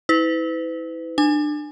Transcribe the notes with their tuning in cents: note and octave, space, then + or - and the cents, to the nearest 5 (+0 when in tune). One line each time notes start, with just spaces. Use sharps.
E4 -30 B4 +40
D4 +30 G#5 +0